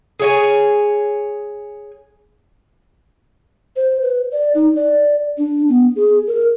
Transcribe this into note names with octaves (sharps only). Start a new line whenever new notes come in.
G#4 C#5 G#5
C5
B4
D5
D#4
D5
D4
B3
G#4
A#4